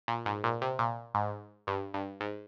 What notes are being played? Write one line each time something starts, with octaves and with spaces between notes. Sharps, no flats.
A#2
G#2
A#2
C3
A#2
G#2
G2
G2
G#2